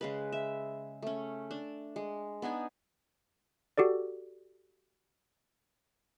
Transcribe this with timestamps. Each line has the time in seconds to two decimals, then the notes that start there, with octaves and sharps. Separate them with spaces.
0.01 C#3 G#3 B4
0.32 E5
1.02 A3 C#4
1.51 D4
1.96 G#3
2.42 B3 D4 D#4 G#5
3.78 F#4 G4 A4 D5